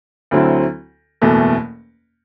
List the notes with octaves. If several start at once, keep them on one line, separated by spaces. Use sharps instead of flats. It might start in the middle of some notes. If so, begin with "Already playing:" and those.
D2 D3 F#3 C4 E4
F#1 E2 B2 A3